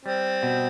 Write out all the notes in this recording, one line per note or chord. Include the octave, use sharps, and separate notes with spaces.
G3 C4
B2